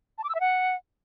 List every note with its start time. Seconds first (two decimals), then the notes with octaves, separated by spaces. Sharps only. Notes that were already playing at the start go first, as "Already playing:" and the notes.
0.18 A5
0.24 D6
0.29 E6
0.35 E5
0.40 F#5